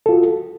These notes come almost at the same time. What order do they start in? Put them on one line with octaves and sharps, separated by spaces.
A4 F4 F#4